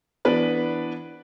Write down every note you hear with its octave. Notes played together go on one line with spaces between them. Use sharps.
E3 B3 D4 B4 D5